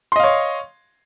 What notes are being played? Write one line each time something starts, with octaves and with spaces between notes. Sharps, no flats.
C#5 D#5 F5 C6